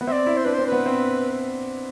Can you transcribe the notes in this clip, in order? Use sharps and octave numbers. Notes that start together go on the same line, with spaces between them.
B3
C4 D5 E5
E4
C5
D4 B4
C5
C4
B4
B3
C4